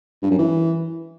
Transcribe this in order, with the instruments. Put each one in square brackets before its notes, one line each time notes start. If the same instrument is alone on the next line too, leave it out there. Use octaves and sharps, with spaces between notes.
[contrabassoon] G2
F#2
E3